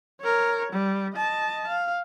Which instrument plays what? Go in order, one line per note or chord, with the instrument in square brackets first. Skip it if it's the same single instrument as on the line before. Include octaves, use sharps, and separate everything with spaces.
[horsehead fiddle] A#4 C#5
G3
D#5 A5
F5